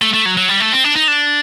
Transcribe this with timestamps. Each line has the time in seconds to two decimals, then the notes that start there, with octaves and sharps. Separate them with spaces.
0.02 A3
0.14 A3
0.26 F#3
0.37 F#3
0.49 G3
0.60 A3
0.73 C4
0.84 D4
0.96 D#4
1.08 D4